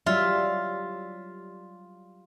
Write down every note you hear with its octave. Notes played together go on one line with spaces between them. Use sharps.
F#3 G3 F4 E5